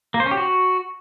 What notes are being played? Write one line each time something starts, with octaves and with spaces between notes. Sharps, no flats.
A#3
C5
C#4
G4
F#4